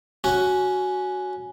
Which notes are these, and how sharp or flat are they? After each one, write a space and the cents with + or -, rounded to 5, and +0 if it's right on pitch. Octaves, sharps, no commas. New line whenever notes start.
C#4 +10 F#4 +0